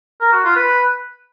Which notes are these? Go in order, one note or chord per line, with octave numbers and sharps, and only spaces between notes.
A#4
F#4
F4
B4